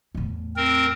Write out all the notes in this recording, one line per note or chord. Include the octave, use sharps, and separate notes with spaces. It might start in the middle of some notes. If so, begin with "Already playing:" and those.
E2 A2
C4 A#4